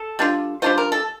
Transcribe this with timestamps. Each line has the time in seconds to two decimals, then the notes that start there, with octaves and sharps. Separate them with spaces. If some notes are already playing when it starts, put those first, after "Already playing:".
Already playing: A4
0.19 G3 D4 F4
0.62 G3 D4 F4 C5
0.78 A#4
0.92 A4